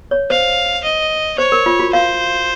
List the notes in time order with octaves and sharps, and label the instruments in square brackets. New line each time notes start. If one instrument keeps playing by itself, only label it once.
[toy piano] C#5
[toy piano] C5 [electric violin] F5
[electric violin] D#5
[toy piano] C5 [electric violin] C#5
[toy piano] A#4
F4
F#4
[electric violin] C5 [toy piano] F5